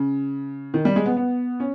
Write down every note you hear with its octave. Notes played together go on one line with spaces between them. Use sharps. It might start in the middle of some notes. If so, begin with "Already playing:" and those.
Already playing: C#3
D#3
G3
G#3
B3
B3
C#4